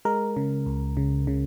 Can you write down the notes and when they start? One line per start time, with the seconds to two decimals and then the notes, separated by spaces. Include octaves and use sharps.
0.05 G#3 A#4
0.37 C#3
0.66 C#2
0.97 C#3
1.27 C#3